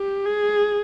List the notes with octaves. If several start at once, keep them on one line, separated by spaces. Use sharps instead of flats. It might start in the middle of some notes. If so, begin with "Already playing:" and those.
Already playing: G4
G#4